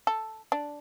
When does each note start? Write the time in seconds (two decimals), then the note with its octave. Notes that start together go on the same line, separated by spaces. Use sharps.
0.07 A4
0.52 D4